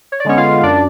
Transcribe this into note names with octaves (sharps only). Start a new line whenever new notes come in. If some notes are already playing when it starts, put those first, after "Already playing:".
C#5
D5
D3 G#3 B3 C#4 C#5
F4 F5
F#2 D4 D5